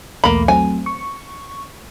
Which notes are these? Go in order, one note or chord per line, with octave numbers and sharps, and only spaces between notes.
B1 E2 A3 A#3 B5
F#3 A3 C4 G#5
C#6